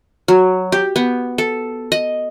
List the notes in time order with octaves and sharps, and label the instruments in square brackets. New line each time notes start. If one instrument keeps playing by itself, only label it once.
[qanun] F#3
G4
B3
A4
D#5